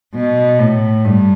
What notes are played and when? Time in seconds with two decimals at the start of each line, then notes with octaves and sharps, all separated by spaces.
0.15 B2
0.59 A2
1.05 G2